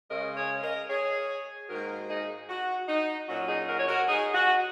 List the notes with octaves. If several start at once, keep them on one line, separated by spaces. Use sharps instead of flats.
C#3 G#3 C#4 A#4 D#5
G#4 C#5
A#4 D#5
G#4 C#5
G#2 D#3 A#3 F#4 A#4
D#4 G#4
F#4
D#4
A#2 F#3 C#4 F#4
D#4 G#4
F#4 A#4
C#5
F#4 A#4
D#4 G#4
F#4